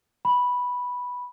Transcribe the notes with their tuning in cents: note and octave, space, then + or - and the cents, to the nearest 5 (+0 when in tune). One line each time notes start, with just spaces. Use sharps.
B5 -5